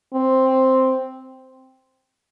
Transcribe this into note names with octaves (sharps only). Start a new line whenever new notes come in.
C4